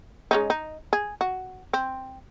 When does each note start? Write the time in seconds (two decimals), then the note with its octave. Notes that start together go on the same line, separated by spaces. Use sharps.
0.31 G#3 C#4 D#4
0.50 D#4
0.93 G#4
1.21 F#4
1.73 C4